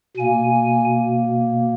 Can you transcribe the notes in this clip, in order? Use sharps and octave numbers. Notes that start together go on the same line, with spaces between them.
B2 A#3 G#5